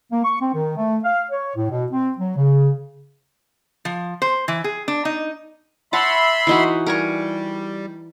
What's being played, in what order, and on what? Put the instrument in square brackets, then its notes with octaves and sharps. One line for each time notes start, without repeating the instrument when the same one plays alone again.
[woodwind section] A#3
C#6
C4
D#3
A3
F5
C#5
A2
B2
C4
F#3
C#3
[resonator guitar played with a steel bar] F3
C5
E3
G#4
D4
D#4
[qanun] C#5 F#5 A5 [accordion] E5 B5 C6
[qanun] E3 D#4 F#4
[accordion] G3 [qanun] A#4 G#5 C#6